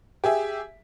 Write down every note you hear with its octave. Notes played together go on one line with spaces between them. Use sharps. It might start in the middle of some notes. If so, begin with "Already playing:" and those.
G4 G#4 E5